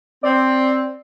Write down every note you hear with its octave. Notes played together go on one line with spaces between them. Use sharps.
C4 D5